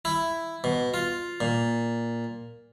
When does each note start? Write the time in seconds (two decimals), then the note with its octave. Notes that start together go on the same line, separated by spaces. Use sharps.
0.05 E4
0.64 B2
0.94 F4
1.41 A#2